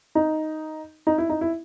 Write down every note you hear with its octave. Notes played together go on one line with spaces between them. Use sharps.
D#4
D#4
E4
D#4
E4